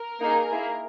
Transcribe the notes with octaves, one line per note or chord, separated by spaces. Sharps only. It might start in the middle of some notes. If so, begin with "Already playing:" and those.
Already playing: A#4
A#3 D#4 G#4
A#3 E4 G#4